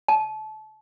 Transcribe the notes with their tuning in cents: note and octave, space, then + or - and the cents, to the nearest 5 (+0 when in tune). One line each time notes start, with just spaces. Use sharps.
A5 -30